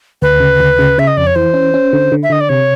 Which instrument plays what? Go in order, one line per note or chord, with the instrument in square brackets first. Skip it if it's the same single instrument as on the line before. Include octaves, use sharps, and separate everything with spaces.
[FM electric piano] D2 [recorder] B4
[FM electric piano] C#3
D2
C#3
[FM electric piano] C#3 [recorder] E5
[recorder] D#5
[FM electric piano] F2 [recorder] D5
[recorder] C#5
[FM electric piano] E3 [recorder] C5
[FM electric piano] C#4
C#4
D3
D3
[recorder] E5
[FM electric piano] D3 [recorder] D#5
[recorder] D5
[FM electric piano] C3 [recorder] C#5